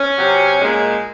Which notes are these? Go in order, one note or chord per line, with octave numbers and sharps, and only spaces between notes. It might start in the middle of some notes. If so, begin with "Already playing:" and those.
Already playing: C#4
C3 F#3
A#2 G#3